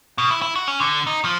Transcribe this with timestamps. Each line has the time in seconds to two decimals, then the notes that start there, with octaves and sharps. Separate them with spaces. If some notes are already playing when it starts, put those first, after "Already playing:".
0.18 B2
0.31 E4
0.42 E4
0.56 F#4
0.68 C#4
0.80 D3
1.07 D#4
1.25 F3